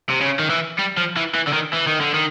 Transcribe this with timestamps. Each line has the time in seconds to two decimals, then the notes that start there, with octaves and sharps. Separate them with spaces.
0.10 C3
0.21 C#3
0.39 D#3
0.50 E3
0.78 G3
0.97 F3
1.16 E3
1.35 E3
1.48 D3
1.54 D#3
1.74 E3
1.88 D#3
2.01 D3
2.14 D#3